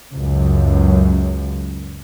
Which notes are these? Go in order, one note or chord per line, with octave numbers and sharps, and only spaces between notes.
C#2 F#2